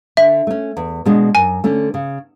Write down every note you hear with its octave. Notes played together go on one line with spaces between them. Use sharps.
D3 E5
A3 C#4
E2
B2 G#3 D4
F#2 G#5
D3 A3 C#4
C#3